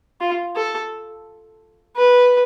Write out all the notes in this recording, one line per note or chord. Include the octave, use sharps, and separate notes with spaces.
F4
A4
B4